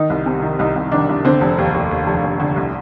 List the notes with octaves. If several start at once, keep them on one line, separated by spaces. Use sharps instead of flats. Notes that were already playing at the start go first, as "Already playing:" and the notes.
Already playing: D#3 D#4
C2
C3
D#3
C2 D#4
C2
D#3 D4
C2
D3 C4
F1
D#2
D#2
D#2
F1
D#2
D3
C2